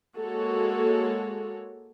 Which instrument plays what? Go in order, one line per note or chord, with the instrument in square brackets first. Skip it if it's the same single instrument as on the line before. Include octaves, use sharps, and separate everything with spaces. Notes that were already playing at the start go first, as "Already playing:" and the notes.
[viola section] G#3 A#3 F#4 A4 C#5